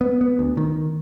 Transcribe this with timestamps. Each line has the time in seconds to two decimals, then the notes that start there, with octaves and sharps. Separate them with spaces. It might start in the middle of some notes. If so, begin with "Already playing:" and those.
0.01 B3
0.21 B3
0.39 D2
0.57 D#3